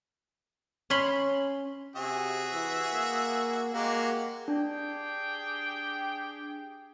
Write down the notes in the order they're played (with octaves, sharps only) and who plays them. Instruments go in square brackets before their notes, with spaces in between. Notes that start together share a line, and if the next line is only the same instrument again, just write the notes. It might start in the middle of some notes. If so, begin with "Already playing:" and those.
[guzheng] C#4 C#5 B5 C6
[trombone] C3 [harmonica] F#4 G#4 E5
[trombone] E3
A#3
[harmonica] G#3 F#4 G4 [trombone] A#3
[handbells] D4 [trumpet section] G4 G#4 G5